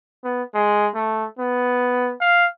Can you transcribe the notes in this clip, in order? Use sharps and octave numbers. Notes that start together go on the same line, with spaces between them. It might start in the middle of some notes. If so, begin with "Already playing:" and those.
B3
G#3
A3
B3
F5